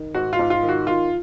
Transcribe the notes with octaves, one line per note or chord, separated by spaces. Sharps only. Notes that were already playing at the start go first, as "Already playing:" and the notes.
Already playing: D#3
G#2 F#4
F4
G#2
F4
D#3
F#4
D#3 F4